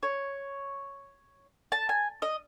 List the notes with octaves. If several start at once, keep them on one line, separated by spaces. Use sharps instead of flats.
C#5
A5
G#5
D#5